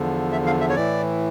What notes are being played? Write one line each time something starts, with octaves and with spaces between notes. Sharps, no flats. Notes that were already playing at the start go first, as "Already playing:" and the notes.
Already playing: E2 D3 F3
E5
F5
E5
C#5
A2 E3 D5